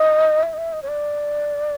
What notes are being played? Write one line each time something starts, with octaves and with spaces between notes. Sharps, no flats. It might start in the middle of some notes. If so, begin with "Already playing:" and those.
Already playing: D#5
E5
D#5
E5
D#5
C#5
D5